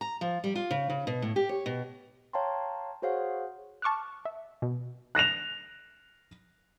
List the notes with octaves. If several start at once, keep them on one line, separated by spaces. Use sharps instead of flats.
A#5
F3
G3
F4
C#3
C#3
B2
A2
G4
C#5
B2
C#5 F5 G5 A5 A#5 C6
F#4 G#4 C5 C#5 F5 F#5
A5 C#6 D6 F6 F#6
E5
B2
F#6 A#6 E7 F7